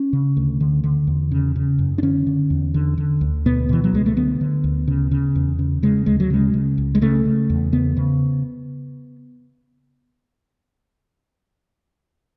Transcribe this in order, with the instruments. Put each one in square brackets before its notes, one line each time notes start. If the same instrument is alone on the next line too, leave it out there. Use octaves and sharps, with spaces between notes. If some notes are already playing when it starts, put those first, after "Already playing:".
Already playing: [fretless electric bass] C#4
C#3
D2
D3
D3
E2
C#3
C#3
F#2
D4
D3 C#4
D3
E2
D3
D3
D2
B2 B3
B2 E3
F#3
C#2 G#3
A3
D3 B3
D3
D2
C#3
C#3
E2
C#3
C#3 G#3
D2 G#3
F#3
C#3 G#3
C#3
C#2
G#3
C#3 A3
C#3
E2
C#3 B3
C#3